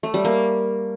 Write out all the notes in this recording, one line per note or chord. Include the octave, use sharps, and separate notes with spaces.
A3
G3
A#3